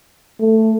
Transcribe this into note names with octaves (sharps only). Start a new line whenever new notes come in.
A3